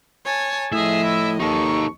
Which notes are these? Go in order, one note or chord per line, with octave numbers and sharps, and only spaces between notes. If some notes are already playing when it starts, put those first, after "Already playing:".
C#5 G#5 A5
A2 F3 G#4 D#5 E5
E4
D#2 D#4 A4 C#6